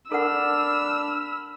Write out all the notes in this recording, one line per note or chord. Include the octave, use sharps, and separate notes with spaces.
D4 A4 A#4 F#5 B5 E6 F6